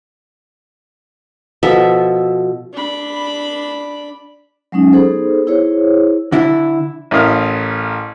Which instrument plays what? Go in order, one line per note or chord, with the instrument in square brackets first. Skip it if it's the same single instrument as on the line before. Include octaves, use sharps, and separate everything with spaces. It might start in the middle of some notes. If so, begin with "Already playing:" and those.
[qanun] B2 F3 A4 E5
[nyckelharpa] D4 B5
[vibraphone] F#3 G#3 C#4 D#4
B3 D#4 G#4 A4 C5
E4 G#4 C5 C#5
[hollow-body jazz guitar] D3 E4
[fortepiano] A1 E4 A#4 D#5 F5 F6